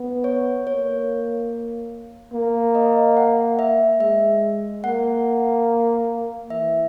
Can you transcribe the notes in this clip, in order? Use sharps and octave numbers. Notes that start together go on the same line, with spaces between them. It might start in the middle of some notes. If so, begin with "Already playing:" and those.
Already playing: B3
C#5
A#3 C#5
A#3
D#5
F#5
E5
G#3 E5
A#3 F#5
E3 E5